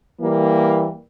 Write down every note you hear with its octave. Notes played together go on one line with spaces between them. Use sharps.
E3 G3 A#3